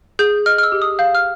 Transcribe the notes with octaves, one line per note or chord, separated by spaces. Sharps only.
G#4 G6
D#5 F6
F6
E6
G4
D#6
F5 G6
F6